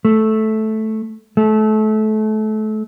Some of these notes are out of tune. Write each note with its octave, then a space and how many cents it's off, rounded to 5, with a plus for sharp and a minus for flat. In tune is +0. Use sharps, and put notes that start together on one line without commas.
A3 -10
A3 -30